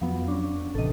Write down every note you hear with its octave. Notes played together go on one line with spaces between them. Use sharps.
F2 F3 F#3 B3
C#4 D4
A1 C3 E3 A4 D#5